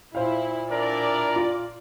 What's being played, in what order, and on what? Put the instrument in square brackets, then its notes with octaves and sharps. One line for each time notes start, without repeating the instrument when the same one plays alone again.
[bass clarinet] A#2 [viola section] E4 [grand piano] C5 F5
[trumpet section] D4 E4 A#4 [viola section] D5
[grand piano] F4